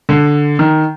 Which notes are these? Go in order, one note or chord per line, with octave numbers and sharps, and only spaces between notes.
D3
D#3